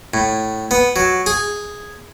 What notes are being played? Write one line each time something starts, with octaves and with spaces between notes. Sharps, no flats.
A2
B3
F#3
G#4